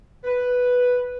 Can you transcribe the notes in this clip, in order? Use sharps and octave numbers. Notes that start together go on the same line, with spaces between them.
B4